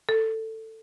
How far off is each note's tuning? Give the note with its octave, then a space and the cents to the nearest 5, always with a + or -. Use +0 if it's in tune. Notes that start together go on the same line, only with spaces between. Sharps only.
A4 +15